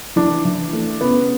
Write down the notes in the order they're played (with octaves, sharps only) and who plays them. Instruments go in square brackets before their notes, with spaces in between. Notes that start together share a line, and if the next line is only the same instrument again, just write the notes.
[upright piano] E3 [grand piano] D4
[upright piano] E3
A3
[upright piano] C#3 [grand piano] B3